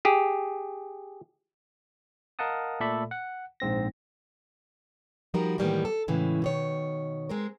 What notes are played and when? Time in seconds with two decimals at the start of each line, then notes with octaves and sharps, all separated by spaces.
0.05 G4 G#4
2.39 A#4 D#5 F5 F#5 A5 D#6
2.80 A#2 A3 A4 D5 E5 B5
3.11 F#5
3.60 A#1 G#2 C4 A#6
5.34 F3 G3 D#4 F#4 A#4
5.58 A2 D#3 E3 G3 A#3 B3
5.85 A4
6.08 A2 C#3 E3 G#3
6.42 B2 D#3 C#5
7.29 G#3 C4 A#4